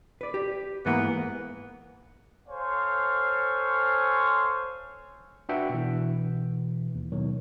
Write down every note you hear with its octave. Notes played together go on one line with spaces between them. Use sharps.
B4 D5
G4
G#2 E3 A#3 B3
A4 C5 C#5 F5 G#5
D4 F#4 B4 E5 F#5 G5
B2 E3
D#2
B2 D#3 F#3